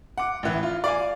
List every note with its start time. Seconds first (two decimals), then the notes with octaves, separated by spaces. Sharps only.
0.18 F#5 D6
0.43 A1 E3
0.63 F4
0.84 D5 F5 G#5